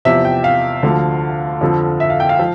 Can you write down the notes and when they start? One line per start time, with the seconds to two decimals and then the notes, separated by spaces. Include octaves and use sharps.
0.05 E2 C3 F3 E5
0.25 G5
0.44 F5
0.83 D2 D3 F3
1.61 F2 D3 F3
2.00 E5
2.10 F5
2.20 G5
2.29 F5
2.39 F3